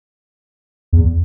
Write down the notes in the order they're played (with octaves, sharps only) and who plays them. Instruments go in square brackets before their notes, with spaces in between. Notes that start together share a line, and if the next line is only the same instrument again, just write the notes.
[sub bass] E2